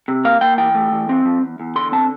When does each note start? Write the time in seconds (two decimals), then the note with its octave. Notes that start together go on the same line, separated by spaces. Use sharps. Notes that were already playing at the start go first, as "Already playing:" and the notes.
0.08 C3
0.25 A#3 F5
0.41 A#3 G5
0.58 E3 G5
0.75 A3
0.92 E3
1.09 C4
1.25 F3
1.42 E2
1.60 E2
1.76 D3 C6
1.92 C4 A5